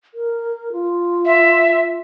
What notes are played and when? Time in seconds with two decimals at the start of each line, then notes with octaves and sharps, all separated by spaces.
0.14 A#4
0.72 F4
1.25 E5